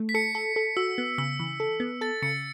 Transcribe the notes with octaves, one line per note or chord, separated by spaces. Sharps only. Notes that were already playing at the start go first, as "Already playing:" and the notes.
Already playing: A3
B6
A4 C#7
A4
A4
F#4 E6
B3
C#3 E6
E3
A4
B3
A4 A6
C#3 C#7